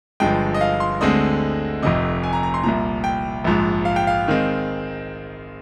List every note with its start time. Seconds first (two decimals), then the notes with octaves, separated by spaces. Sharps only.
0.20 G1 G2 F3 G#3 G5
0.54 D#5
0.61 F5
0.80 C6
1.01 D2 D3 G#3 C4 D#5
1.82 F1 F2 C3 D#5
2.24 G#5
2.33 A#5
2.43 A#5
2.54 C6
2.64 C2 A#2 F3 A#5
3.04 G5
3.44 A#1 G#2 F3
3.85 F5
3.96 G5
4.07 F5
4.28 D#3 G#3 C4